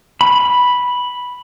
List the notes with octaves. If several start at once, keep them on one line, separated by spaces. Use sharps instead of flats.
B5